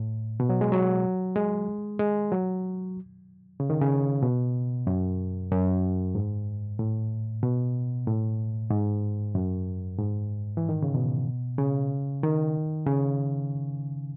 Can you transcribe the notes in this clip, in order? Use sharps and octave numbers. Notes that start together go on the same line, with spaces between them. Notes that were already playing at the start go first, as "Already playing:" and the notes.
Already playing: A2
B2
F#3
G#3
F#3
G#3
G#3
F#3
C#3
D#3
C#3
B2
F#2
F#2
G#2
A2
B2
A2
G#2
F#2
G#2
E3
D#3
C#3
B2
C#3
D#3
C#3